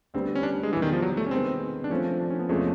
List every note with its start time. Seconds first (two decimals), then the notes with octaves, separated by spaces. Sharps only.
0.14 D2 D3 G3 B3 C4
0.35 C#4
0.43 D4
0.63 G#3
0.72 E2 B2 E3 G3
0.82 D#3
0.93 F3
1.02 F#3
1.17 A3
1.26 C#4
1.31 C3 D#3 G#3 B3 C4
1.84 D4
1.90 F3 A3 C4 C#4
2.20 D4
2.30 C#4
2.39 B3
2.49 E2 C3 F3 G#3 A3 C#4